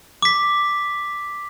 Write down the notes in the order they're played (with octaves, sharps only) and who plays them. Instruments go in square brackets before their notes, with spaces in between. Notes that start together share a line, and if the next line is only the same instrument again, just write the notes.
[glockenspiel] D6 B6